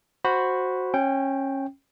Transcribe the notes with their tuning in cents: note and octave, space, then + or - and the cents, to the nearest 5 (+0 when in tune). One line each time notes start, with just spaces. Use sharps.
F#4 +0 C5 +5 B5 +0
C#4 -20 G5 +0